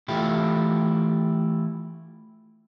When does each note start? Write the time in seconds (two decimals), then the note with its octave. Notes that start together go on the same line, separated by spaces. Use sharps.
0.08 E3 A3 E4 F4 G4